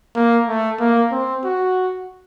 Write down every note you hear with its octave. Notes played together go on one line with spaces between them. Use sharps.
A#3
A3
A#3
C4
F#4